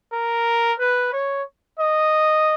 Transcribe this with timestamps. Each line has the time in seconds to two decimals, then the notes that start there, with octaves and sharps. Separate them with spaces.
0.13 A#4
0.79 B4
1.13 C#5
1.79 D#5